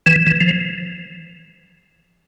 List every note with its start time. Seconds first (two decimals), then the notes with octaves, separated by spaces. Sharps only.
0.06 E3
0.27 E3
0.41 F3